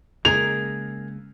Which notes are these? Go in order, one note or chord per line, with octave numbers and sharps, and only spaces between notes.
C#3 G#3 A#3 G#4 A#4 F7